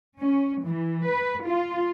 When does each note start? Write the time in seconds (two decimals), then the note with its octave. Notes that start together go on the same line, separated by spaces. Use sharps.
0.17 C#4
0.63 E3
1.05 B4
1.46 F4